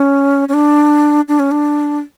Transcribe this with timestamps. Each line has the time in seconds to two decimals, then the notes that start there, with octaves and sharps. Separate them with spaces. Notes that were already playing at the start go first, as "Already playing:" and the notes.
Already playing: C#4
0.49 C#4
0.54 D4
1.28 D4
1.39 C#4
1.51 D4